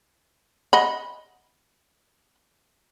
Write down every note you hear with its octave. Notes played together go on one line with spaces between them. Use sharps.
D#5 F#5 B5